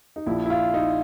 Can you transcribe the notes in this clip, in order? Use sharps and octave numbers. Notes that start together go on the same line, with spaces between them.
D#4
A#1 A#2 F3 E4
E4
F4
D#4